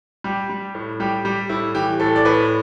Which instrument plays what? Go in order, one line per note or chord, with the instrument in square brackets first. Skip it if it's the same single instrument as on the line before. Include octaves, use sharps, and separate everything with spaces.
[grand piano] G3 G4
G3
A2
G3 G4
G3 G4
A2 E4
E3 G4
A2 A4
D5
A2 B4